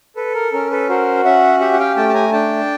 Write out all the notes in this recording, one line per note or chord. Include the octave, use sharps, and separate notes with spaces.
A4 B4
A#4
C#4 A#4
A4 B4
F#4 A#4 C5
C#4 E5 F#5
G4 E5 F#5
F#5
F5 G5
A3 G5 A5
A5
G#5 A#5
D4 G5 A5